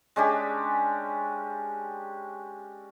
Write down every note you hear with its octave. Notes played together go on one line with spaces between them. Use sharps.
G#3 C#4 D4 G4